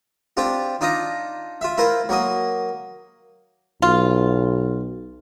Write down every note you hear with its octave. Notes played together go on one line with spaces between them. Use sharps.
C4 D4 F4 G4
D4 D#4 F4 D#5 A#5
F4 E5
E4 F4 A#4 C5
F#3 A#3 D#5
B1 F4